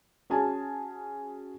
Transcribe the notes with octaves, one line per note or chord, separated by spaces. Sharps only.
C#4 F#4 G#4 G#5 A5